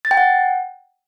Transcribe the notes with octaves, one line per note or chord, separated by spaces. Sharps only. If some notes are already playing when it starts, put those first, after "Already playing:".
A6
G5
F#5